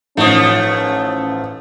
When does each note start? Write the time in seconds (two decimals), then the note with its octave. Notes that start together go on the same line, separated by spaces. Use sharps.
0.17 A1 F3 A3 C#4 D#4 D#6